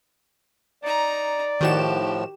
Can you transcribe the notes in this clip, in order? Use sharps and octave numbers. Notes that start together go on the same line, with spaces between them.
D#4 D5 A#5
A2 D#3 F3 F#4 G4 E7